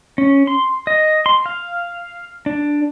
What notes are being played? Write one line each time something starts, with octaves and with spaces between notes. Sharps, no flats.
C#4
C6
D#5
C6
F5
D4